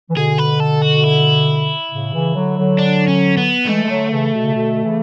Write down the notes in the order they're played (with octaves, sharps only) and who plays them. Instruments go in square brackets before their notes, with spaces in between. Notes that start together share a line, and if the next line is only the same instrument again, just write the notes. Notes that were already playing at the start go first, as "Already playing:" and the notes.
[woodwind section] E3
[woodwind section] B2 D3 [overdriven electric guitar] G#4
[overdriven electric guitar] B4
A4
F#4
E4
[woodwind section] A2 C#3
C#3 E3
D3 F#3
D3 F#3
[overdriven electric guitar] D4
C#4
B3
[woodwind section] E3 G#3 [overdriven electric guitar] A3
[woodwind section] G#3
D3 F#3
C#3 E3
B2
C#3
B2 D3
C#3 E3